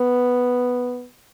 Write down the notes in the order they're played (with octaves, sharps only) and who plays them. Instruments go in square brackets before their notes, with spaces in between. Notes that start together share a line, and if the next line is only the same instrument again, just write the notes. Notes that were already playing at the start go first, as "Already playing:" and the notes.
Already playing: [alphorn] B3